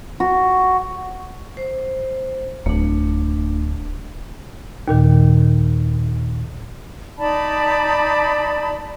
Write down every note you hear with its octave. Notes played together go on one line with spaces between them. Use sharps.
F#4
C5
D1 A3 D4
D#2 A#2 D#3
D#4 D5 A5 B5